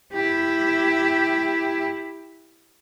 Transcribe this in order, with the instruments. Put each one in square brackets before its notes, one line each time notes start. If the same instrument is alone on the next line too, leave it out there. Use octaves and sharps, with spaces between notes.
[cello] E4 G4